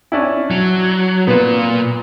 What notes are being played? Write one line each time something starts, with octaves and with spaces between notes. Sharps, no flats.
C#4 D4 E4
F#3
A#2 B3 F4 B4